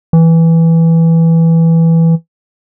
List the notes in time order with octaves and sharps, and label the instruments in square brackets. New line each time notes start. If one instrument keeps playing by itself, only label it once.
[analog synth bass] E3